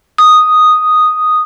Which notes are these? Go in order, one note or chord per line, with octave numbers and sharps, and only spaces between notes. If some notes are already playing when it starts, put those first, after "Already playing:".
D#6